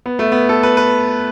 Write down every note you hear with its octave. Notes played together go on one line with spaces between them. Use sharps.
B3
A3
B3
A4
B4
B4